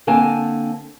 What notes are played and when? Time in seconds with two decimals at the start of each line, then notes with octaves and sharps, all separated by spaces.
0.07 D3 A#3 C4 G#5 A5